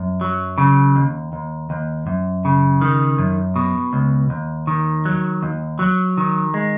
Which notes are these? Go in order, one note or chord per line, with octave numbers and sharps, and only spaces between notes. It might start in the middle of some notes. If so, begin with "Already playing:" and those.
Already playing: F#2
F#3
C#3
D#2
D#2
D#2
F#2
C#3
D#3
F#2
B2
C#2
D#2
D#3
F#3
D#2
F#3
D#3
G#3